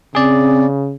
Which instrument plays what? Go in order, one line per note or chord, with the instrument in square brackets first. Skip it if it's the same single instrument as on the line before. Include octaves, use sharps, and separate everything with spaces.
[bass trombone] C#3 [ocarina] C4 [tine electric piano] G#4 D5